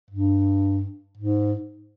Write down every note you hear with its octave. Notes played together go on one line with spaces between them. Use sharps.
G2
G#2